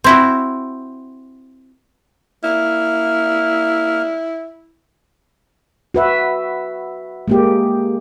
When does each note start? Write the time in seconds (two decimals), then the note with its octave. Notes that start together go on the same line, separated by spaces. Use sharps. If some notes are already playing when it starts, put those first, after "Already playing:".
0.04 C4 E4 F#4
2.43 A#3 E4 F6
5.94 F#4 B4 E5
7.28 G#3 A#3 G4